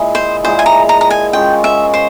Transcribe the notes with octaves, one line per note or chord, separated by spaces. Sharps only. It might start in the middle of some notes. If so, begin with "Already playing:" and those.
Already playing: A#2 G#3 E4 G#4
C5
A#2 G#3 E4 G#4 C5
G#5
A#5
A#5
A#5
G#5
A#2 G#3 C#4 F4 G5
E5
C5